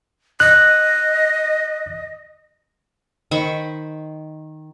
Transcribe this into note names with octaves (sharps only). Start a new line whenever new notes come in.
D#5 F#6
D#3 C5 B5 C#6